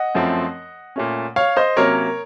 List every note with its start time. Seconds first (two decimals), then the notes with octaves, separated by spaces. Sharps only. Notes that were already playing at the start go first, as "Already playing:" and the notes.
Already playing: D#5 F#5
0.15 F#2 F3 A3 C4
0.96 A#2 A3 C#4
1.36 C#5 F5
1.57 C5 D#5
1.77 C3 F#3 A#3 C#4 A#4 C#5